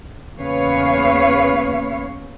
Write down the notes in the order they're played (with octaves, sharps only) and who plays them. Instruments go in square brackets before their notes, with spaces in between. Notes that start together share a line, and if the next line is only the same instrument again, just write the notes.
[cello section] E2 C#3 A#3 B4 C#5 F5